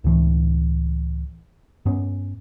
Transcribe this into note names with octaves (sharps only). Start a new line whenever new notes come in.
C#2 A2 E3
G2 B3 C#4